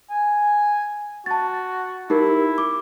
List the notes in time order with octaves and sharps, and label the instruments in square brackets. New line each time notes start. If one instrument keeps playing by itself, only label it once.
[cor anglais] G#5
[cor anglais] F#4 [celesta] A5 A6
[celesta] D#4 G4 A#4 [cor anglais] E4
[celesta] D6